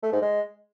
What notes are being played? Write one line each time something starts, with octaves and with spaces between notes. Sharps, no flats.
A3
G#2
G#3